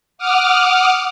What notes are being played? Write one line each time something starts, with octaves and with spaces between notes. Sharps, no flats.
F#5 D6 D#6 F6